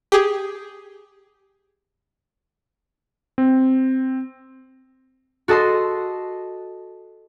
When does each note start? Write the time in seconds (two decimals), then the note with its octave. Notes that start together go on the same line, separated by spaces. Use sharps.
0.12 G4 G#4
3.38 C4
5.48 F#4 A4 D#5 A5 C6